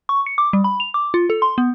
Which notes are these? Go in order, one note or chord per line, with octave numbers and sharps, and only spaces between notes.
C#6
C#7
D6
G3
B5
F7
D6
F4
A4
C6
B3